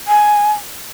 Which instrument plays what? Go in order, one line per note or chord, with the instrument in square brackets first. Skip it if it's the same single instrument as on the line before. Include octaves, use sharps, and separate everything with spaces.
[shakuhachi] G#5